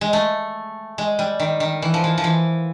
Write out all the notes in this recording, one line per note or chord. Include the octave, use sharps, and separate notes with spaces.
G#3
A3
G#3
G3
D#3
D#3
E3
F3
E3
F3
E3